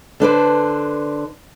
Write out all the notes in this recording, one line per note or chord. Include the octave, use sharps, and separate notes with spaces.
D3 D4 B4 C5